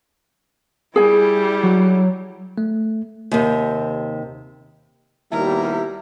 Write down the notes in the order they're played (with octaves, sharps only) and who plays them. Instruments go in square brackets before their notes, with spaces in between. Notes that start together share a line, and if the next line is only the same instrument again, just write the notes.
[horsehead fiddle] G3 E4 [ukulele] G#4 G#5
[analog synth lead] F#3
[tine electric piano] A3
[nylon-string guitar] D#2 C3
[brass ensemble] D#2 B2 G3 [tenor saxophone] E4 [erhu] A#4